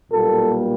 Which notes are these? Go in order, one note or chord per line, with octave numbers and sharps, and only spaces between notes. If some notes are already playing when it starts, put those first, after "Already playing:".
B1 A#2 G3 A#3 A4